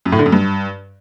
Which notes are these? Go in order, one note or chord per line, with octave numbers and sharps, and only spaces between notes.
F#2
A2
D3
F#2
G2